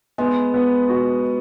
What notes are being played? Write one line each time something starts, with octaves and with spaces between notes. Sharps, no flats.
G#3 B3
B3
F#4